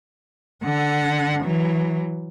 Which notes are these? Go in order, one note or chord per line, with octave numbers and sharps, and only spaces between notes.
D3 F#5
E3 F#3